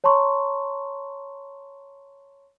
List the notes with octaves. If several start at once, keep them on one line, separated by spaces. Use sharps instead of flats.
C#5 A5 A#5 C6 C#6